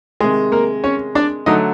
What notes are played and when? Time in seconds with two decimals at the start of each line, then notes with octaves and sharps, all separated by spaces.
0.20 C3 D#3 G#3 G#4
0.52 A#3 A#4
0.84 C#4 C#5
1.15 D4 D5
1.46 D3 F#3 A3 D#4 D#5